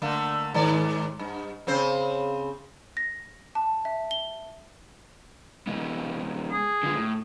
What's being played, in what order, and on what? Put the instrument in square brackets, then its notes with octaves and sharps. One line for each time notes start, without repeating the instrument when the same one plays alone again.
[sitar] D3 A3 A#3
G#2 D#3 D5
G2
C#3 C4 C5
[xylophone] A#6
A5
E5
G7
[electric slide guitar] C3 G#3 B3
[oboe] G#4
[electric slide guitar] D3 F4
A2